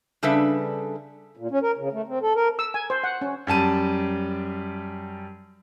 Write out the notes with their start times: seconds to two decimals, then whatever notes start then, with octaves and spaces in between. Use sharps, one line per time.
0.23 C#3 G3 D4 A4 B4 E5
1.37 A#2
1.51 C#4
1.62 A#4
1.77 C#3
1.93 A3
2.07 C4
2.22 A4
2.35 A#4
2.59 E6
2.74 G#5
2.90 C5
3.04 F#5
3.21 C#4
3.47 F#2 G3 A5 D#7